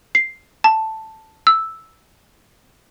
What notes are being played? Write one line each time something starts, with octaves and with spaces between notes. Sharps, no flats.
C7
A5
E6